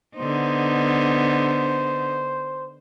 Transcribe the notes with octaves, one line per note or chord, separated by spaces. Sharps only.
D3 B3 D#4 C5